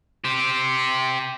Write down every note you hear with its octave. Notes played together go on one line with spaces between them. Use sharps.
G4 C5